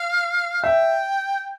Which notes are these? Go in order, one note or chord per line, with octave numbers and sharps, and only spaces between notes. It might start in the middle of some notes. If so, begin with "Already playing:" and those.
Already playing: F5
E5 G5